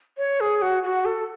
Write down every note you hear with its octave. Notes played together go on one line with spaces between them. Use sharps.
C#5
G#4
F#4
F#4
A4